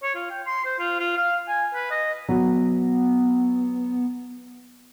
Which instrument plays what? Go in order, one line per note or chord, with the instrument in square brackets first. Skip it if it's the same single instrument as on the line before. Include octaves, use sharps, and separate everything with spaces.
[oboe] C#5
F4
G5
C6
C5
F4
F4
F5
G#5
B4
D#5
[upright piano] F#3 [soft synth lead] B3